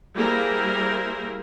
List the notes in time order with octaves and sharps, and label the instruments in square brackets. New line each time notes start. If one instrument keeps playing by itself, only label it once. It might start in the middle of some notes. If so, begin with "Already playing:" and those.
[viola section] G3 A#3 E4 G#4 A#4 C5